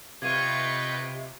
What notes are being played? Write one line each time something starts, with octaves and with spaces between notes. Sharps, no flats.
C3 F4 B4 D#5 G5 C#6 G#6 D#7